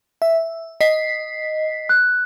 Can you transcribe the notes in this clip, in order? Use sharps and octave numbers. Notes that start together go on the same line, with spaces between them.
E5
D#5 B6 C7
F#6